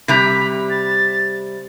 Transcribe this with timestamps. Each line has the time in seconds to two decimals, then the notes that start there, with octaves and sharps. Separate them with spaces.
0.08 C3 G3 A#5 B5
0.70 A6